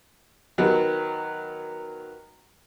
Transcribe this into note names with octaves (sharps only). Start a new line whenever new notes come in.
D#3 F#3 B3